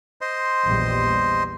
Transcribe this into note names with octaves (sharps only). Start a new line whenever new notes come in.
C5 D#5 C6
A#1 E2 G3